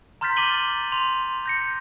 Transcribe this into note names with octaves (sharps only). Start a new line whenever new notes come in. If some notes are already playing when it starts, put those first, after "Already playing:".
A#5 C6 F6 G6 A6 B6
D6 A6 D#7 F#7 G7
C6 F7
G6 A#6 C#7